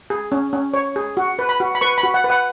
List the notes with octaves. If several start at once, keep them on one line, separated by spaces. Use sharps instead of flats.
G#4
C#4
C#4
C#5
G#4
F#4
B4
B5
F#4
B5
B4 C#6
B5
F#4
F#5
B4
F#5